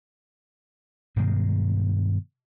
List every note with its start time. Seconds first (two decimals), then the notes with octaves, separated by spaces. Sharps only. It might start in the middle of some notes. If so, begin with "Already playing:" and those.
1.16 G2 B2 D#3 G#3